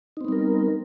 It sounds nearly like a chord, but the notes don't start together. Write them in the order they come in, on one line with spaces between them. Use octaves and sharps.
D#4 C4 B3 G3 A#4